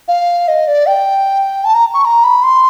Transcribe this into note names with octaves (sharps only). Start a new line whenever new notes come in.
F5
D#5
D5
G5
A5
A#5
C#6
A#5
B5
C6